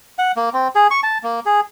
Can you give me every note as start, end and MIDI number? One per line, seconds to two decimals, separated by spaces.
0.18 0.32 78
0.36 0.49 58
0.53 0.68 60
0.75 0.87 68
0.91 1.00 85
1.03 1.18 81
1.23 1.40 58
1.46 1.60 68